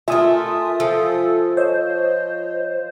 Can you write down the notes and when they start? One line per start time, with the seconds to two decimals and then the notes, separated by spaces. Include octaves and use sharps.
0.08 A3 F4 A#4 E5 G#5 D#6
0.80 F3 F4 A4
1.57 C5 C#5 D#5